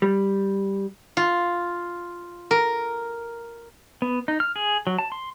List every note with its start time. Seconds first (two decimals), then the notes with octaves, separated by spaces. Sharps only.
0.02 G3
1.17 F4
2.51 A#4
4.02 B3
4.28 D#4
4.40 F6
4.56 G#4
4.87 F#3
4.99 A5
5.12 C6